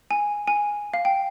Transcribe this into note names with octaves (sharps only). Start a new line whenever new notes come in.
G#5
G#5
F5
G5